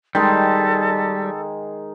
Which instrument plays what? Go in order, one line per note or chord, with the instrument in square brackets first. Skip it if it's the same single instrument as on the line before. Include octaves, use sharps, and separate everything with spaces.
[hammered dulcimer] D#3 G#3 G#4 [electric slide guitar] G3 [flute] A4